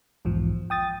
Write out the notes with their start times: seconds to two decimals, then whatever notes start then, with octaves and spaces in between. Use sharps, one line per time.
0.25 B1 E2 G#2 F3
0.70 G5 D#6 A6